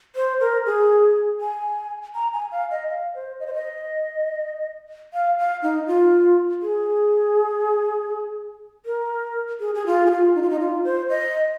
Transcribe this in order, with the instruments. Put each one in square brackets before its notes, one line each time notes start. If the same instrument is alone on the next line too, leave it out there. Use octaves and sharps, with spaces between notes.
[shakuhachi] C5
A#4
G#4
G#5
A#5
G#5
F5
D#5
F5
C5
D#5
C5
D#5
F5
F5
D#4
F4
G#4
A#4
G#4
G#4
F4
G#4
F4
D#4
F4
D#4
F4
C5
D#5